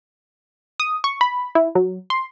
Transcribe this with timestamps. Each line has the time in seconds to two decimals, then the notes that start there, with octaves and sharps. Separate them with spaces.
0.80 D#6
1.04 C#6
1.21 B5
1.55 E4
1.75 F#3
2.10 C6